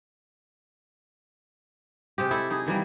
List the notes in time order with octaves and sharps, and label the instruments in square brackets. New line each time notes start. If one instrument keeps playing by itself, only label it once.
[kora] C3 G#3 G4
E4 A4 E5
D#4 E4 G#4
D#3 E3 G3 A#3